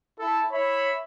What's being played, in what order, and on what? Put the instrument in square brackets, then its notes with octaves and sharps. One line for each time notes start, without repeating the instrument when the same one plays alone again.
[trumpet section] E4 A4
E4 C#5 E5 B5